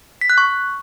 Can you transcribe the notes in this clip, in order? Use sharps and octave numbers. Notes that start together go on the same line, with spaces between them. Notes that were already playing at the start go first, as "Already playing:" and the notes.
B6
F#6
C#6